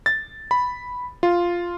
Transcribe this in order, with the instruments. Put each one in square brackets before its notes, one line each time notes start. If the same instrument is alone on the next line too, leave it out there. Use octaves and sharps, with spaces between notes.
[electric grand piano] A6
B5
F4